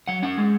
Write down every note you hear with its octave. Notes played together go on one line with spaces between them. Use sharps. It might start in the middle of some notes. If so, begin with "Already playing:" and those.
F#3 F#5
C#4 F#5
G#3